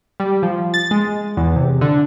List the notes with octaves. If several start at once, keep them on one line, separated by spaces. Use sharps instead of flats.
G3
F3
A6
G#3
E2
C3
D3